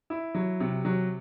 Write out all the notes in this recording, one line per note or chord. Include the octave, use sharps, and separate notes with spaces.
E4
F#3
C3
F#3